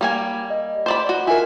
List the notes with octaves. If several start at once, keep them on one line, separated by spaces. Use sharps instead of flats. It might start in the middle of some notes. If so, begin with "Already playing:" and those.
G3 A#3 G#5
D#5
C5 D5 B5
F#4
E4 F4 A#4 G#5